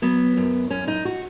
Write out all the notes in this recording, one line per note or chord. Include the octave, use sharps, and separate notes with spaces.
F#3 B3
F#2
F#2 C#4
D#4
F#4